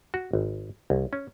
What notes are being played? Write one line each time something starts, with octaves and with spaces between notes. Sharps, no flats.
F#4
G#1
C2
C#4